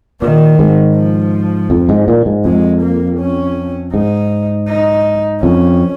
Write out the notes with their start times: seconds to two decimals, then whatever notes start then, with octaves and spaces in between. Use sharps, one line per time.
0.21 A#2 D#3
0.59 G#2
0.96 F3
1.70 F2
1.89 G#2
2.08 A#2
2.26 G#2
2.45 F2 G#3
2.82 A#3
3.19 C#4
3.94 G#2 D#4
4.68 D#4
5.42 F2 C#4